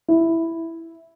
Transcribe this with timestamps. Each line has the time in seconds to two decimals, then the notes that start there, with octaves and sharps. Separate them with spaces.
0.08 E4